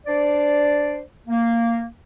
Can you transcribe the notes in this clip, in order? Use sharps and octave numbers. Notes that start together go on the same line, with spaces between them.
D4 C5 D5
A#3